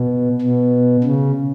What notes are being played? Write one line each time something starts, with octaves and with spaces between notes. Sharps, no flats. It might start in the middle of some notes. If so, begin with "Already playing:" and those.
Already playing: B2
B2
C#3